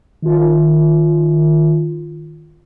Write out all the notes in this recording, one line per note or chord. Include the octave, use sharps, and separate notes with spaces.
D#3 F4